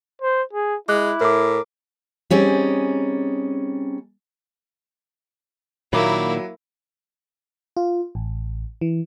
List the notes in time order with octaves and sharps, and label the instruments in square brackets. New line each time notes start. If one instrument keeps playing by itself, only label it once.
[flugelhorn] C5
G#4
[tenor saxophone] G#3 [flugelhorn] E4 [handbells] D6 F#6
[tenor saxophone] A2 [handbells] A#4 D6
[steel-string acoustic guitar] G3 C4 C#4 D#4 G#4
[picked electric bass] A#2 D#3 [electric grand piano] F#3 [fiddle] A#3 E4 [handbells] B5 D6
[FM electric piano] F4
A1
E3